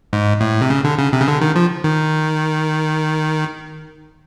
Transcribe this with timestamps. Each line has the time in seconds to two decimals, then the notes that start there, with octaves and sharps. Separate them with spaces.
0.13 G#2
0.41 A2
0.62 C3
0.70 C#3
0.84 D3
0.98 C#3
1.13 C3
1.21 C#3
1.28 D3
1.41 D#3
1.56 F3
1.84 D#3